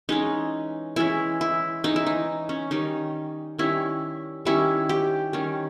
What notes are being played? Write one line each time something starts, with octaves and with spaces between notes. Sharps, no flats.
E3 G#3 C#4 D#4
E3 G#3 C#4 E4
E4
E3 G#3 C#4 D#4
E4
D#4
C#4
D#3 G3 C#4 D#4
D#3 G3 C#4 E4
D#3 G3 C#4 E4
G4
D#3 G3 C#4